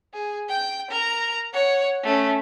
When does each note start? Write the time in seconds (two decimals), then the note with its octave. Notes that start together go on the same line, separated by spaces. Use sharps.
0.14 G#4
0.49 G5 G6
0.91 A#4 A#5
1.53 C#5 F#5
2.03 A3 C#4